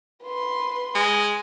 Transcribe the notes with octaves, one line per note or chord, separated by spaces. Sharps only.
B4 C6
G#3